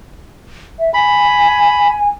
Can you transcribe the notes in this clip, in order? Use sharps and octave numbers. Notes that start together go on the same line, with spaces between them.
E5
G#5 B5